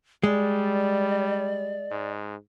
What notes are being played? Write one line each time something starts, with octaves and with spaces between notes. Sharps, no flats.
G3 G#3 D5
G#2